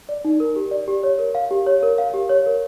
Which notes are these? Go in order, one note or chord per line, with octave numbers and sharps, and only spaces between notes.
D5
D#4
A#4
G4
D5
G4
C#5
A#4
F5
G4
C#5
A#4
F5
G4
C#5
A#4